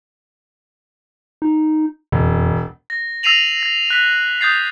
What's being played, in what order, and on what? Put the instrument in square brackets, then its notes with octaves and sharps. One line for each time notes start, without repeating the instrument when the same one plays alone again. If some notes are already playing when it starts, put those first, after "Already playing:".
[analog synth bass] D#4
[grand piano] E1 [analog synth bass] F2
[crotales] A#6
E6 A#6 C7 D#7 F7 F#7
A#6
F#6 B6
D#6 G6 A6 C7